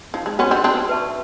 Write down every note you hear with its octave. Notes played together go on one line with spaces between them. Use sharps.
F3 D#4
G#3
B3 C#4 F#4 B4
C4 D4
C4 D4 F#4
B4 E5 A5 C#6